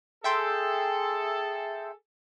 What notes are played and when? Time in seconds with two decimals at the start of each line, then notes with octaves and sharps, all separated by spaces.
0.24 G#4 A4 E5 G5 C6